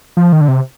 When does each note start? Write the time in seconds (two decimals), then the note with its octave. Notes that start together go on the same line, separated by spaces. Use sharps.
0.17 F3
0.32 D#3
0.41 D3
0.48 C3